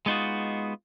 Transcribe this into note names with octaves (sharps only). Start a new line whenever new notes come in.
G#3 B3 D#4 F4 F#4